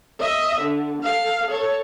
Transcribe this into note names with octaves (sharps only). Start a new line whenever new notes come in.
D#5 E5
D3
A4 F5
A4 C#5